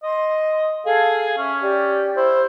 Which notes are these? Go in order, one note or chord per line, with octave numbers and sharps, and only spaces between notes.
D#5 C6
G#4 A4 F5 G#6
C#4 E5
G4 D5 G5
E4 C5